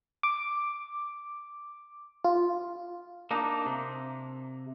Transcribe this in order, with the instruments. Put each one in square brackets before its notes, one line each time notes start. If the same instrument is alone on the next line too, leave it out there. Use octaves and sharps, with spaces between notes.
[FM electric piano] D6
F4
[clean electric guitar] A#3 D4 D#4
C3